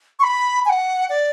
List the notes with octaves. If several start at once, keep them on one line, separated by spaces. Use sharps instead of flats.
C#6
B5
G#5
F#5
D5